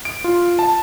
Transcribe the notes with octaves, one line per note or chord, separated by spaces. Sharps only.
D7
F4
A5